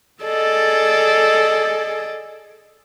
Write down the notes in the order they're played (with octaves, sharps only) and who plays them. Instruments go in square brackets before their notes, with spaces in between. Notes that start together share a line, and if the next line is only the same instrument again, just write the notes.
[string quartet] G#4 A4 D5 D#5